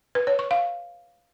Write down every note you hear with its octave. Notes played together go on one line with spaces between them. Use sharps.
B4
C#5
C#6
F5